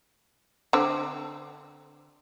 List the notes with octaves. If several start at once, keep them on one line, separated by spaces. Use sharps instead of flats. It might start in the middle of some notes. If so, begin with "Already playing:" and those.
D3 C4